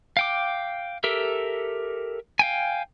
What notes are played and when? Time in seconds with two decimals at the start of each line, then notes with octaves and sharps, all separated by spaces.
0.17 F5 G5 D6
1.04 G4 A4 A#4 E5
2.39 F5 G5 G#5